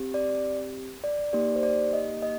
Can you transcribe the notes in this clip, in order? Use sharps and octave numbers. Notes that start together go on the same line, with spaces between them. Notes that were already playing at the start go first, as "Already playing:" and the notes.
Already playing: C4 G4
D5
D5
A#3 D#4 G4 D5
C5
D5
D#5
D#5